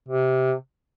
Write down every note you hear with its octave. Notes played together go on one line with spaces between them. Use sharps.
C3